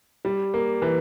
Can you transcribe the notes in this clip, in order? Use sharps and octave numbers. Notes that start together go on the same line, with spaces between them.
G3
A#3
E3